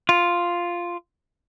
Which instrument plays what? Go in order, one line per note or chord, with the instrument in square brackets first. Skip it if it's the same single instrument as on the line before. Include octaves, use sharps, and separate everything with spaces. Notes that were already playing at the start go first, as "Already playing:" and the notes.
[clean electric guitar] F4